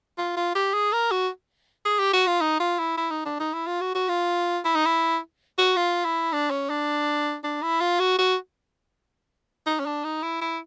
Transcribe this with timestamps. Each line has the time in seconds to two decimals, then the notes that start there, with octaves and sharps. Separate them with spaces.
0.18 F4
0.36 F4
0.55 G4
0.74 G#4
0.92 A#4
1.11 F#4
1.85 G#4
2.00 G4
2.14 F#4
2.27 F4
2.41 D#4
2.60 F4
2.79 E4
2.98 E4
3.11 D#4
3.25 D4
3.40 D#4
3.53 E4
3.67 F4
3.81 F#4
3.95 F#4
4.09 F4
4.65 E4
4.75 D#4
4.86 E4
5.58 F#4
5.77 F4
6.05 E4
6.33 D4
6.51 C#4
6.70 D4
7.44 D4
7.62 E4
7.81 F4
8.00 F#4
8.19 F#4
9.67 D#4
9.80 C#4
9.86 D4
10.04 D#4
10.23 E4
10.42 E4